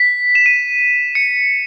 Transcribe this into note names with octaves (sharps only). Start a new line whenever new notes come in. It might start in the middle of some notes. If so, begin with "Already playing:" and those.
Already playing: B6
E7
D#7
C#7